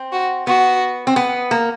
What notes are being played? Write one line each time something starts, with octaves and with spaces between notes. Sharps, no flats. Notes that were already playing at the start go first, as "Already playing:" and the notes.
Already playing: C4
F#4
B3 F#4
C4
B3
A#3